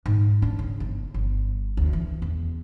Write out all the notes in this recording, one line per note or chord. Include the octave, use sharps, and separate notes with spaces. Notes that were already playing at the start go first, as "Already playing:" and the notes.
G#2
D4
C#3
G1
G1
D2
E3
E2